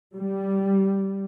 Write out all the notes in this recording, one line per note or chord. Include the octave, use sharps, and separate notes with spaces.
G3